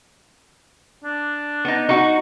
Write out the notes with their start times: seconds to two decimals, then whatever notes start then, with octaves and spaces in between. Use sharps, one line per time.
1.04 D4
1.65 B3 D#4
1.89 D#4 F#4 C#6